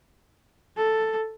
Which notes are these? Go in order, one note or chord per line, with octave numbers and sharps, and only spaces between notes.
A4